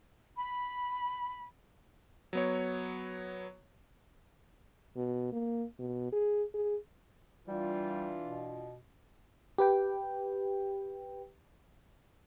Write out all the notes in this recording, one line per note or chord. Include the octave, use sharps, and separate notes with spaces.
B5
F#3 B3 C#5
B2
A#3
B2
G#4
G#4
E3 G3 D4 F4
B2
G4 B4 G5